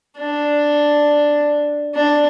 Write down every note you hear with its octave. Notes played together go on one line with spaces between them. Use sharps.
D4
D4